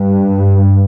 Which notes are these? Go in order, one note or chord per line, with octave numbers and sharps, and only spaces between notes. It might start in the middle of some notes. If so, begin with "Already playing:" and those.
Already playing: G2